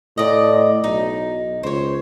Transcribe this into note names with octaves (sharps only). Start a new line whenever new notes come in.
A2 D5 D#5
B1 D#4
C#2 C5 C#5